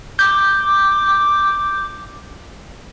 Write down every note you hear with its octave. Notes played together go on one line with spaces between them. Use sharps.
D6 G6